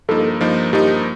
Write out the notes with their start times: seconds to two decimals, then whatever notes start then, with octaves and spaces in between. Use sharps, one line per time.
0.09 G2 F3 A#3 D#4 A4
0.41 G2 F3 A#3 D#4
0.73 G2 F3 A#3 D#4 G4